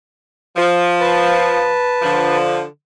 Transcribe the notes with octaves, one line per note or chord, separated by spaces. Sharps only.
F3
B4 A5
D3 F3